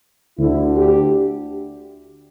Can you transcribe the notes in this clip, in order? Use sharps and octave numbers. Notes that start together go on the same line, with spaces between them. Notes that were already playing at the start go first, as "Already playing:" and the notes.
D2 D3 E4
G4